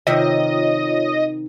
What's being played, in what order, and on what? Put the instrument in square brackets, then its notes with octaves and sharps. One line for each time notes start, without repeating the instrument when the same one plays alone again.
[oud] C3 D#3 E5 [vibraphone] F4 C#5 [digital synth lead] D#5